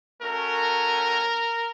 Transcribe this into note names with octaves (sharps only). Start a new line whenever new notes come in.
A3 C#4 F#4 A#4